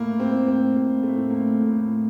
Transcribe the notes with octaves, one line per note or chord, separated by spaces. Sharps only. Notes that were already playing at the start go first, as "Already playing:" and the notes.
Already playing: A2 A#3
A2
C4
A2
C4
A2
A2 A#3
A2
A3
A2
A#3
A2
A2
A2